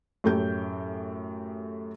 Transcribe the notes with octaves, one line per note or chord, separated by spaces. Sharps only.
F#2 A2 A3 G4 G6